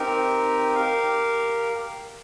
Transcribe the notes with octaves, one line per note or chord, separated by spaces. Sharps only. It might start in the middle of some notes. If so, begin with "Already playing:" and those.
Already playing: C4 D#4 G4 A#4
G4 A#4 F5